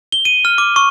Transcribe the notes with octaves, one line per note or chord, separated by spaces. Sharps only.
G7
D#7
F6
D6
C#6